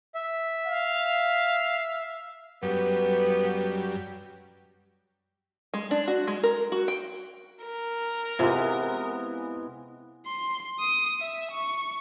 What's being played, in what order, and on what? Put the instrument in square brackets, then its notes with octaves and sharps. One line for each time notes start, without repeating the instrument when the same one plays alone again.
[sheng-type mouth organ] E5
[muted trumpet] F5
[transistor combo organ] F#2 G3 [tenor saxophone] B3
[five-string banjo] G#3
D4
F#4
G#3
A#4
F#4
G5
[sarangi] A#4
[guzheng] C3 [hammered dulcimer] E3 G#3 B3 [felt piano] F4
[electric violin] C6
D#6
E5
C#6